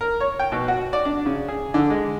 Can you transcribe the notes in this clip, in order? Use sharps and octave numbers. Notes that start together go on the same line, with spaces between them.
A#4
C#5
G5
B2
F#4
D5
D4
C#3
G#4
D3
G#3